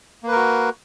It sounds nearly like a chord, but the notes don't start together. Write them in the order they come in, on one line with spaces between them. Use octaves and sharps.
A#3 B4 A#4 F#4